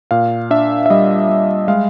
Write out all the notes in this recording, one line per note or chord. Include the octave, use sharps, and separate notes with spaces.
A#2 F5
D4 E5
E5
G3 D#5
G3
G#3 F5